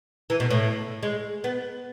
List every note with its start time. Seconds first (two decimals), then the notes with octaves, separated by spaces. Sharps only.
0.30 E3
0.40 B2
0.51 A2
1.03 G#3
1.44 B3